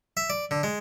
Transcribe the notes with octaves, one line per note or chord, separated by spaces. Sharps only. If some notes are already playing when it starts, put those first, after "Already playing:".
E5
D5
D3
G#3